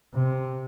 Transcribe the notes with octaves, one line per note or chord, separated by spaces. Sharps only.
C3